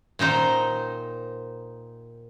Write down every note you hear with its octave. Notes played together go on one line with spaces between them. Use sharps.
A#2 D#3 D#4 C5